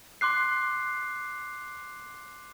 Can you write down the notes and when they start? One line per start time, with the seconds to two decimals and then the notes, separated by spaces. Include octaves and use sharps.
0.21 C6 D6 F#6 C7